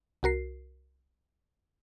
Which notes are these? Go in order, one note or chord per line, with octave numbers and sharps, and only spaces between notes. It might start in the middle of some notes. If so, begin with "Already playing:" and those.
C2 F#4 A#4 C7